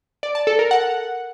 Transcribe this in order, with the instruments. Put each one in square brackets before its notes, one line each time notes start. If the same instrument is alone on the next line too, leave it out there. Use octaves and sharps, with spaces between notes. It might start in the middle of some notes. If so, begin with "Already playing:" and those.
[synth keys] D5
A5
A4
A#4
F#5